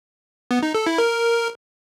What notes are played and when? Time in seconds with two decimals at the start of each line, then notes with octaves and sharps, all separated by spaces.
0.51 B3
0.63 D#4
0.75 A4
0.86 E4
0.98 A#4